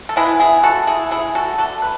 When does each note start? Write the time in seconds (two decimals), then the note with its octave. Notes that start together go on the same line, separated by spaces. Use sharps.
0.09 A4
0.16 E3 G#3 B3 E4 G#4
0.40 E4 G#4
0.63 F#4 A4
0.87 E4 G#4
1.11 E4 G#4
1.35 F#4 A4
1.58 D3 A3 F#4 A4
1.82 B4